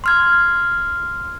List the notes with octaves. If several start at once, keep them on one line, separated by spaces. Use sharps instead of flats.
C6 F6 G#6